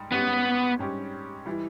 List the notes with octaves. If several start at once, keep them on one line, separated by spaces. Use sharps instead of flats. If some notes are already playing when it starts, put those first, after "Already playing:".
Already playing: G#2 G3
G#2 G3 B3 C#4 G4
G#2 G3 C#4 G4
E3 G3